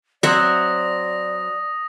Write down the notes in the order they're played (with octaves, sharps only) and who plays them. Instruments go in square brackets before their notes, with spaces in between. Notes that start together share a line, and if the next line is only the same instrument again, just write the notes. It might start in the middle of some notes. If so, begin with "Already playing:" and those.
[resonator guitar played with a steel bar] F#3 C4 C5 [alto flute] D5 [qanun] E5 F#5 [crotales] D#6 A#6